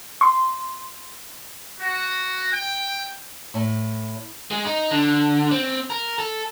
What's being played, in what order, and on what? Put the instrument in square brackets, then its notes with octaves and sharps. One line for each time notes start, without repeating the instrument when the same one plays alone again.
[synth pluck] C6
[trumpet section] F#4
G5
[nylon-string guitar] A2
[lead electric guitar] G#3
D#4
D3
C4
A#4
A4